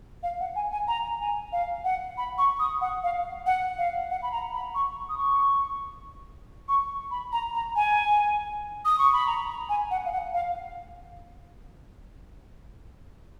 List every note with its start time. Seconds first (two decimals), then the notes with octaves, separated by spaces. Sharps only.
0.23 F5
0.40 F#5
0.56 G#5
0.72 G#5
0.88 A#5
1.20 G#5
1.52 F5
1.84 F#5
2.18 B5
2.38 C#6
2.59 D#6
2.81 F#5
3.04 F5
3.46 F#5
3.78 F5
4.11 F#5
4.23 B5
4.32 A#5
4.54 B5
4.75 C#6
5.09 D#6
5.18 C#6
6.69 C#6
7.11 B5
7.32 A#5
7.54 A#5
7.76 G#5
8.85 D#6
8.99 C#6
9.13 B5
9.27 A#5
9.48 A#5
9.69 G#5
9.91 F#5
10.05 F5
10.12 F#5
10.34 F5